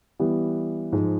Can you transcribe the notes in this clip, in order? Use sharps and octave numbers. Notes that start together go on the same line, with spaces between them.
E3 G3 B3
G#2 F3 G#3